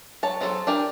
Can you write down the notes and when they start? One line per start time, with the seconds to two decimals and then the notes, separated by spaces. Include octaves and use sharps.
0.23 F#3 C#5 A5
0.41 F3 F#3 G#4 A4
0.67 D4 G4 A#4 G#5